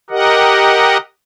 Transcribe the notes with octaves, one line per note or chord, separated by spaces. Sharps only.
G4 A#4 D#5 F#5